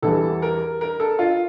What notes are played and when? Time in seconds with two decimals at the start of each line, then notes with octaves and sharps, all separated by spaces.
0.02 E2 E3 G3 A4
0.42 A#4
0.81 A#4
1.00 A4
1.19 F4